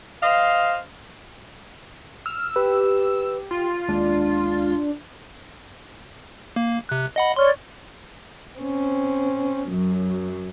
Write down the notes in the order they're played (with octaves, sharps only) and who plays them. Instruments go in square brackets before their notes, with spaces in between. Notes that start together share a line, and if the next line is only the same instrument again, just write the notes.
[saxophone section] C5 D#5 F5
[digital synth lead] E6 [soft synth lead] F6
[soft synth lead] G4 [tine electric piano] B4
[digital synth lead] F4
[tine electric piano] D#2 G#3 [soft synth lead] D4
[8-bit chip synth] A#3
C3 F#6
D#5 F#5 B5
[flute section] C#5 D5 C#6 [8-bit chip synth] C6 F6
[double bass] C4 C#4
F#2 F#3